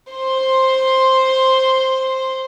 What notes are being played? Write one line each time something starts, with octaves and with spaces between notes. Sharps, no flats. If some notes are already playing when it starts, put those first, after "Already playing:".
C5 C6